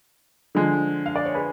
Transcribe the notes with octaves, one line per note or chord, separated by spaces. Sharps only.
D3 F3 G#3
F5
D5
C#5
G#4 B4